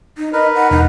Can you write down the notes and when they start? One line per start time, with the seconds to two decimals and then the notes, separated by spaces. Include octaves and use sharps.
0.18 D#4
0.33 A#4 B4 D#5
0.55 F#5
0.71 E1 D#4